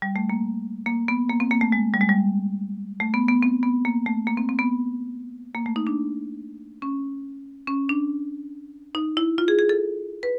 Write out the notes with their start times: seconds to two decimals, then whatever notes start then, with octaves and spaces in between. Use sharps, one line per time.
0.02 G3
0.16 A3
0.30 A#3
0.86 A#3
1.08 B3
1.29 A#3
1.40 C4
1.51 A#3
1.61 A3
1.72 G#3
1.94 G3
2.01 G#3
2.09 G3
3.00 A3
3.14 B3
3.28 B3
3.43 C4
3.63 B3
3.85 A#3
4.06 A3
4.27 A#3
4.37 C4
4.49 C4
4.59 B3
5.55 A#3
5.66 A3
5.76 D#4
5.87 D4
6.82 C#4
7.67 C#4
7.89 D4
8.95 D#4
9.17 E4
9.38 F4
9.48 G#4
9.59 G#4
9.69 A4
10.23 B4